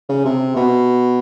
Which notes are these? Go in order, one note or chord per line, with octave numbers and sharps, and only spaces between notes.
C#3
C3
B2